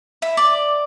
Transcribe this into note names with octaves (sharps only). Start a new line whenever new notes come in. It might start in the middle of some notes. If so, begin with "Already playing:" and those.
E4
D5